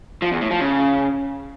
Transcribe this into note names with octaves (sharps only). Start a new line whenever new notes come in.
F3
E2
A2
F3
C#3